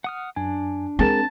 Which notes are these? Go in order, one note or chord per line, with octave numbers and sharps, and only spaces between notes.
F#5 D#6 F6
F#2 D4 G#5
G#3 C4 G#4 A#4 A5